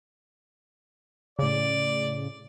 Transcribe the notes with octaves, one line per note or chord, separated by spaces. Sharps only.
A2 C#3 D5